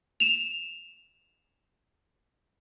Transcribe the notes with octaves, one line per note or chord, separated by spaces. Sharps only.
E7 F7